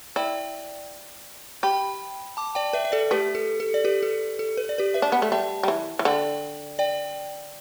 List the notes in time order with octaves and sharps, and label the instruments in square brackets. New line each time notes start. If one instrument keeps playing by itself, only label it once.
[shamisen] E4 [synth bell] D5 G5
[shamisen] G4 [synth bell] G5 B5
[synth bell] A5 D6
D5 G5
B4 E5
E5
A4 D5
[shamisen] A3 [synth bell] G4 B4
[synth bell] A4
A4
D5
G4 B4
A4
A4
B4
D5
G4 B4
B4 E5
[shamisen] D4
B3
A3
[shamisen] G3 [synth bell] E5 A5
[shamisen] G3
E3
E3
[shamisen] D3 [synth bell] D5 G5
[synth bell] D5 G5